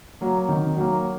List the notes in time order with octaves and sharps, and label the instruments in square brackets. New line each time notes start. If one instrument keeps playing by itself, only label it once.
[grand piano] F#3 A#3
D#3
F#3 A#3